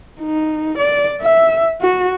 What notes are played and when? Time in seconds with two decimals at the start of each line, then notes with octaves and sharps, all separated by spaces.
0.20 D#4
0.78 D5
1.22 E5
1.81 F#4